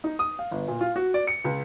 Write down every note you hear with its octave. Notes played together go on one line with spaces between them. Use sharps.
D#4
D#6
F5
G1
A#2
F4
F#4
D5
C#7
C#2